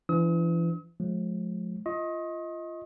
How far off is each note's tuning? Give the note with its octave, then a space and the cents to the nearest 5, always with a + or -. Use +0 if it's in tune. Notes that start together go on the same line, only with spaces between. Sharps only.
E3 +35 D4 -20 D#6 +45
F3 +35 G#3 +45
F4 -20 D#5 +20 C#6 -45